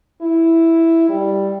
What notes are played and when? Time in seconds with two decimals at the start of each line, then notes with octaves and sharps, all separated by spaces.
0.22 E4
1.09 G3